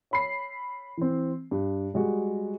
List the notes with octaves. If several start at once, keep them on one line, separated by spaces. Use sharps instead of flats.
C#5 B5 C7
E3 C4
G2
G3 G#3 F#4 G#4